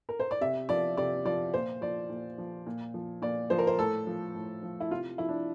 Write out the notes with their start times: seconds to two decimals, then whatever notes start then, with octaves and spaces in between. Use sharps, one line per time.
0.09 A#4
0.20 C5
0.31 D5
0.41 C3 E5
0.69 F3 D5
0.97 C3 D5
1.25 F3 D5
1.53 A#2 C5
1.81 F3 D5
2.10 A#2
2.38 F3
2.66 A#2
2.94 F3
3.22 A#2 D5
3.50 F3 C5
3.59 A#4
3.67 C5
3.78 A2 A4
4.07 F3
4.35 A2
4.63 F3
4.80 E4
4.91 C3 F4
5.18 F3 E4
5.29 D4